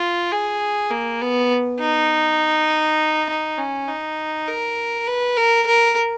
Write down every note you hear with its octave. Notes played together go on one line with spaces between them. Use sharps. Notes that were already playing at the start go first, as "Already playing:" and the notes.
Already playing: F4
G#4
A#3
B3
D#4
D#4
C#4
D#4
A#4
B4
A#4
A#4